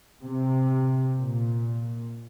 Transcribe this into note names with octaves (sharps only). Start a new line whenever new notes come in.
C3
A#2